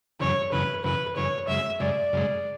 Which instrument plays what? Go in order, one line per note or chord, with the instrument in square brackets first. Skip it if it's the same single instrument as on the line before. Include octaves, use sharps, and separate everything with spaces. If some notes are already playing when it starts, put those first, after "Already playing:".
[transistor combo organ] F#2 C#3 E3 [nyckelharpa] C#5
[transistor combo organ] F#2 C#3 E3 [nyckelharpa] B4
[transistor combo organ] F#2 C#3 E3 [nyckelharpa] B4
[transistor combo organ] F#2 C#3 E3 [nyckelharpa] C#5
[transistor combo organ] F#2 C#3 G#3 [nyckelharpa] E5
[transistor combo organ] F#2 C#3 G#3 [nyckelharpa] D5
[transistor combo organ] F#2 C#3 G#3